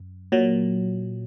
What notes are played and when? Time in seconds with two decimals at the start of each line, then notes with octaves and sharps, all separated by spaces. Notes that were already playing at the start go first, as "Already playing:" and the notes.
Already playing: F#2
0.32 A#2 F#3